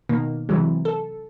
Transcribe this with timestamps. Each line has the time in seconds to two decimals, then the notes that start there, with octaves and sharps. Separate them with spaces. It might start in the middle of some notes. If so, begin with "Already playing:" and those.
0.09 B2 D#3 A#3
0.49 C3 E3 F#3 G#3
0.85 A4